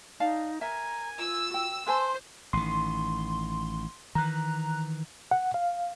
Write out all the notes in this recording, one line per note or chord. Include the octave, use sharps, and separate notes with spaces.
D#4 D5 F5 A5
A#4 E5 G#5 A#5
F4 E6
F#4 G5
B4 C5 G#5 A5 C6
A1 D#3 C6
D#3 E3 A#5 F#6
F#5
F5